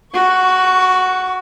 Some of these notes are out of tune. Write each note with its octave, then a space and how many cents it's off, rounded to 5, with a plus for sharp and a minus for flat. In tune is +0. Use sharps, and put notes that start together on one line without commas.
F#4 +0 C#6 +25